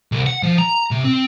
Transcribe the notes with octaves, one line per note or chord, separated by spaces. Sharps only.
C2
F#5
F3
A#5
C3
C4